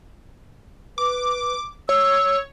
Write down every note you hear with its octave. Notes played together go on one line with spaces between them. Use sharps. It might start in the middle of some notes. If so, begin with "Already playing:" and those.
B4 D6
C#5 E6